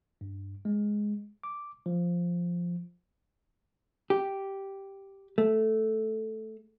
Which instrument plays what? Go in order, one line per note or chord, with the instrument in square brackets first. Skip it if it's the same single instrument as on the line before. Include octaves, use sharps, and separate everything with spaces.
[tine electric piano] G2
G#3
D6
F3
[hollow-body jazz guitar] G4
A3